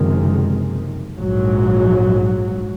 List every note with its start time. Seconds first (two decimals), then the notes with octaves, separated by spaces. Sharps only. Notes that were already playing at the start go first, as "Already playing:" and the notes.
Already playing: F#1 F2 C3 D#3 G#3
1.18 A#1 G#2 F#3